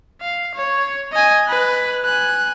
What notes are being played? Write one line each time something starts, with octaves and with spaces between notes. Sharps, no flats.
F5
C#5
D#5 G#5
B4 F#6
G#5 F#6